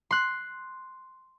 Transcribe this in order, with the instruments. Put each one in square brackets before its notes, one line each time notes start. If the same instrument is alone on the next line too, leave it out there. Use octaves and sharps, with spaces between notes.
[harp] C6 F#6